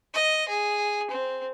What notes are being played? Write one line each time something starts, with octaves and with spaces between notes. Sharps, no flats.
D#5
G#4
C4